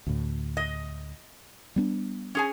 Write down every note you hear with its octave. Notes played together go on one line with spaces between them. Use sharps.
D2 A2
D#5
G3 B3 D4
C#4 G#4 G#5